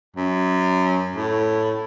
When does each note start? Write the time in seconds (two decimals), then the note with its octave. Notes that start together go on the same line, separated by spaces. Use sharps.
0.16 F#2
1.16 A2